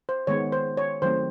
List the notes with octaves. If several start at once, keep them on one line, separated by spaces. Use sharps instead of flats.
C5
D#3 G#3 B3 C#5
C5
C#5
D#3 F#3 A3 C4 C5